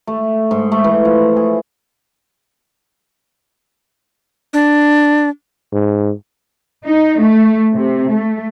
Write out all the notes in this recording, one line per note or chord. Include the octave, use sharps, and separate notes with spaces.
A3
G#2
A3
E3
F3
G#4
D4
G#2
D#4
A3
C3
A3